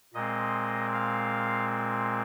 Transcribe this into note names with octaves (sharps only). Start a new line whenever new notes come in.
A#2 G#3 C4 D#5
F5